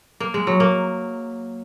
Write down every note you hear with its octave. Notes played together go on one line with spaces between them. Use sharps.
A#3
G#3
F#3
A#3